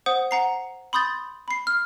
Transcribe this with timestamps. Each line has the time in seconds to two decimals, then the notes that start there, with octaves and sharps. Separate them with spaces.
0.06 C5 F#5 D#6
0.31 F#5 A#5 C7
0.93 B5 C6 D#6 G6 A6
1.48 B5 C7
1.67 F6